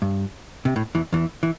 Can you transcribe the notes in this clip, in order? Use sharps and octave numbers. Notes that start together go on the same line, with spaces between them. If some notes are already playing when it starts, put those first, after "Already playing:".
G2
C3
A2
E2 E3
E2 E3
E3